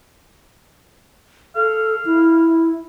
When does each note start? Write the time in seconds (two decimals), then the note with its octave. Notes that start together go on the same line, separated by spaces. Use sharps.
1.56 A4 F5
2.05 E4